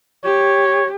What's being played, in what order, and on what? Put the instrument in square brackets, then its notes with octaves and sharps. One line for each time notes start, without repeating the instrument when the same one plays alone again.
[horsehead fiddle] G4 [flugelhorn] C#5